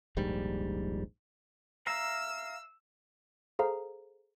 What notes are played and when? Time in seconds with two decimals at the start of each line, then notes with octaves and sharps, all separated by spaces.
0.17 D#1 A#1 G#2 G3
1.87 E5 F5 A#5 E6
3.59 G#4 A4 C5 F5 A#5